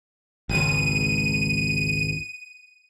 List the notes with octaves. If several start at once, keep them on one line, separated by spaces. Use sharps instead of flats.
G#1 C#2 D#7